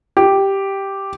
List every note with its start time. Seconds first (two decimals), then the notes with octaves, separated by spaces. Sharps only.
0.17 G4